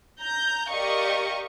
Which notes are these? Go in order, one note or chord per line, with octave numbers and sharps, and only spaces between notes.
A#5 G6
G4 A#4 D5 D#5 F5 C#6